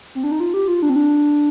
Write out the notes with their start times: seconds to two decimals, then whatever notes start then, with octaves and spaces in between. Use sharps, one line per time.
0.15 C4
0.24 D4
0.32 D#4
0.40 F4
0.54 G4
0.68 F4
0.82 D4
0.90 C4
0.96 D4